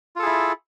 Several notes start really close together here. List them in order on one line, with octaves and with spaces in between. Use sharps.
F4 A4 G#4 E4